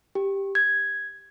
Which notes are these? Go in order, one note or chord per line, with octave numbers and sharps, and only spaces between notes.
G4
G#6